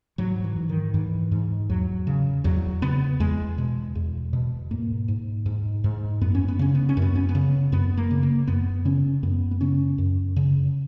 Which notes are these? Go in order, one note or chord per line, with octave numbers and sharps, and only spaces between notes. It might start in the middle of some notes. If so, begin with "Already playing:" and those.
G#2 F#3
E3
G#2
D#3
G#2 E3
G#2
E2 F#3
C#3
E2 F#3
C#3 B3
E2 G#3
B2
E2
B2
G#2 A#3
G#2
G#2
G#2
F#2 B3
C#4
B3
C#3 C#4
B3
C#4
F#2
B3
C#4
B3
C#3
F#2 B3
A#3
C#3
A#3
F#2 B3
C#3 C#4
F#2 B3
B3
C#3 C#4
F#2
C#3